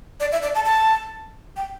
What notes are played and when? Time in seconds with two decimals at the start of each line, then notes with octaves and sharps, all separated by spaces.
0.20 D5
0.32 E5
0.42 D5
0.55 A5
0.65 A5
1.56 G5